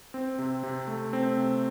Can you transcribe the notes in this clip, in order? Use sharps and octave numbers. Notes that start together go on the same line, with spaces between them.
C4
C3
C3
A3
C4
C3